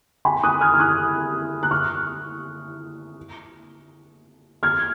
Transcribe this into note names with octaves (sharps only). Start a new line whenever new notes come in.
G#5 B5
D#6 F#6
F6 G#6
F6
D#6 F#6
F#6
C#6 F6
F6 G#6